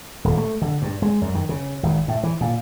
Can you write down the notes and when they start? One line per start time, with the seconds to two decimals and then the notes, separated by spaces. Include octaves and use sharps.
0.24 D#1
0.37 A3
0.62 D3
0.82 G2
1.02 G#3
1.21 F#2
1.34 D#3
1.49 C#3
1.83 G#1
2.08 A2
2.23 E3
2.41 A#2